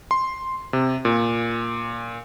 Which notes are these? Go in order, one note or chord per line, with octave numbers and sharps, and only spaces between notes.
C6
C3
A#2